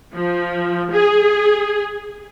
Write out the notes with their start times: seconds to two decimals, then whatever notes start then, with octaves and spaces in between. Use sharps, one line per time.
0.14 F3
0.92 G#4